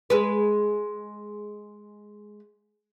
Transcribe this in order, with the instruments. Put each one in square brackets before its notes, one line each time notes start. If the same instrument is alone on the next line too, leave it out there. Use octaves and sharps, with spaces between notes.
[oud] G#3 B4